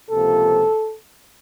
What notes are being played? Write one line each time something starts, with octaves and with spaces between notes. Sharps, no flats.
C#2 C3 F3 A#3 A4